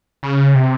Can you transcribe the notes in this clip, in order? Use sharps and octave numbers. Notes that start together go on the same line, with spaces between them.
C#3
C3